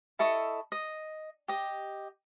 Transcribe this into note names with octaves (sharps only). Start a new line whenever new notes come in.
E4 A4 D#5 C#6
D#5
G4 D#5